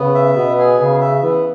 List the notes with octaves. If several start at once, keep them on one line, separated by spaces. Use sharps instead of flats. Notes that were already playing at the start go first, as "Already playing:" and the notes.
Already playing: C#3 B3
E5
B2 B3
G#4
C#3 B3
E5
E3 B3